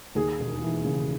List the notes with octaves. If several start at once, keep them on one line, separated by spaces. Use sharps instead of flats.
D#2 G#4
E1
E3
C#3